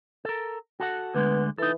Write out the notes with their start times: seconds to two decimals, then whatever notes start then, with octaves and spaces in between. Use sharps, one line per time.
0.25 A4 A#4
0.80 F#4 A4 F#5
1.15 D2 D3 G#3 B3
1.58 E3 D#4 A4